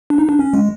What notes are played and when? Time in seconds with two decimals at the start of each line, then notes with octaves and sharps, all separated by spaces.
0.10 D4
0.18 D#4
0.29 D4
0.39 C#4
0.53 G#3